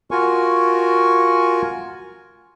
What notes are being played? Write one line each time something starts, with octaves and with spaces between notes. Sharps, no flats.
F4 F#4 A#4 G#5 C#6